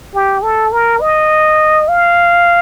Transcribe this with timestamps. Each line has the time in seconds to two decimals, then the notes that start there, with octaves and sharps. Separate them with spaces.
0.14 G4
0.43 A4
0.73 A#4
1.01 D#5
1.88 F5